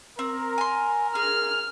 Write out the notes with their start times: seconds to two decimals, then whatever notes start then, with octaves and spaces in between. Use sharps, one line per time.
0.19 C4 A#4
0.58 G#5 C6
1.15 G#4 F6